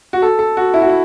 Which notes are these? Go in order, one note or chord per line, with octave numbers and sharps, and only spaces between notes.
F#4
A4
A4
F#4
E4
F#4
E4